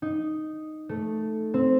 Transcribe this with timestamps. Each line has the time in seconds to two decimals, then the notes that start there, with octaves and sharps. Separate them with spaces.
0.02 D#4
0.89 A3
1.54 C4